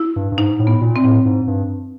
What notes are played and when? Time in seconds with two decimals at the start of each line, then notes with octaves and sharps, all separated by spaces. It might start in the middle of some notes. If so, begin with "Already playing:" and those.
Already playing: E4
0.16 G2
0.32 G2
0.38 G#2 D#4
0.59 A2
0.67 B3
0.81 A#2
0.96 C4
1.04 A2
1.25 G#2
1.47 G2